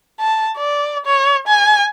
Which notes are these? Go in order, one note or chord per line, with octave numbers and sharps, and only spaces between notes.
A5
D5
C#5
G#5